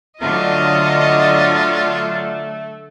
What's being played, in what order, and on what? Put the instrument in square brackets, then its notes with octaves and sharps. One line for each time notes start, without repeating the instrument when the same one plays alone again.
[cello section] D3 F#3 [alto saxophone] A3 [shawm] F4 [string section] D#5